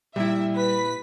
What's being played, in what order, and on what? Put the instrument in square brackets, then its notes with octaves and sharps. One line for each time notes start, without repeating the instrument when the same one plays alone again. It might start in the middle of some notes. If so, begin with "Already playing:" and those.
[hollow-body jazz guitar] A#2 E4 [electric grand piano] G3 [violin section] E5
[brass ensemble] B4 [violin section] B6